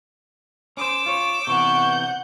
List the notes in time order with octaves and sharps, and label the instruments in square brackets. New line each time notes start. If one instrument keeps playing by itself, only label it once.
[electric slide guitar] C#4 C5 [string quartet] D6 E6
[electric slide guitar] F4 C#5
[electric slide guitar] C3 E3 B3 [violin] F#5 G6 [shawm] C#6